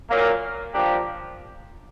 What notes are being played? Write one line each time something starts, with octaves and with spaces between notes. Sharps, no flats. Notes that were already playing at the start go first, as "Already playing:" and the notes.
A#2 F#3 A#3
F3 A#3 D4 G4